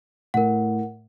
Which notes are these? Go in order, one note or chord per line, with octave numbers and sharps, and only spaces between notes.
A2 A#4 F#5